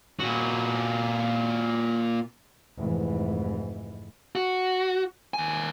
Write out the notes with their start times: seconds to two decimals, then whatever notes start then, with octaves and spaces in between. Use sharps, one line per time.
0.20 A#2 F#4
2.77 F1 G#2 E3
4.35 F#4
5.34 D#2 G#5